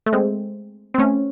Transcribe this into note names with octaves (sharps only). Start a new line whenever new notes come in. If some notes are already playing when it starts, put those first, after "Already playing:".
A3
G#3 C4
C4
A3 C#4